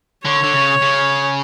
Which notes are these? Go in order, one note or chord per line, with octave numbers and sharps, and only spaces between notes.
D3 C#5
D3
C#3
C#3